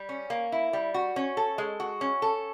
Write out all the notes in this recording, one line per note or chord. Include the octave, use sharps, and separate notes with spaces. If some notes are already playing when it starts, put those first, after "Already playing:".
Already playing: G3
C#4
A#3
E4
G3
F#4
C#4
A4
G#3
F#4
C#4
A4